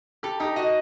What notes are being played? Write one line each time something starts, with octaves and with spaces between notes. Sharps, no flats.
G4 A4
D#4 G4
F#4 D#5